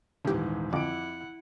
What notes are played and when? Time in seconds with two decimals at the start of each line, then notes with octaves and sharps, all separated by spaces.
0.25 D#1 G#2 C#3 E3 G4
0.73 F2 D3 E4 F#5 D6 D7